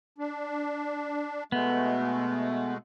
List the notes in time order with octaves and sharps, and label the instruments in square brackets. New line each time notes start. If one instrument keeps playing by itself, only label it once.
[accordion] D4
[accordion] B2 G#3 A3 [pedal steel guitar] B3